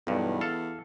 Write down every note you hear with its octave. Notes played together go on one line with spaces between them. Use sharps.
B1 E2 G2
A4 F5